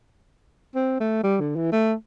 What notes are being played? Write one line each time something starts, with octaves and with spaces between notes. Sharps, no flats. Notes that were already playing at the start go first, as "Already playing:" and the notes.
C4
A3
G3
D3
E3
A3